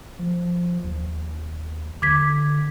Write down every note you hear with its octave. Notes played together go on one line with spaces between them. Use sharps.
F3
D#2
D3 D6 G#6 B6